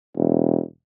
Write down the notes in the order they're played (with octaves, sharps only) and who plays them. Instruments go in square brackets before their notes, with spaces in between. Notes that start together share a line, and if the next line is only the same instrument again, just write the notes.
[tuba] E1